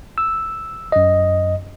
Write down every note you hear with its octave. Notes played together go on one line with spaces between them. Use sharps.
E6
F#2 D#5